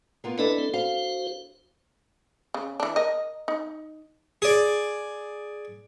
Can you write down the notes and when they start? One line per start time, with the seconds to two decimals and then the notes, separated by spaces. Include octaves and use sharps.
0.24 A#3 B3 F4
0.39 D4 E4 A4 B4 D#5 A5
0.59 C4
0.74 F#4 C5 F5
2.54 C#3
2.80 E3 D4
2.96 A#4 D#5
3.48 D#4
4.42 G#4 D5